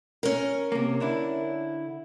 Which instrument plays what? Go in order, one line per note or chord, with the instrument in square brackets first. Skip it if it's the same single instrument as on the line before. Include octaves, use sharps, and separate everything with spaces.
[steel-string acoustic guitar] C#4 A#4
[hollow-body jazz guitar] C3 A#3
D3 D4 E4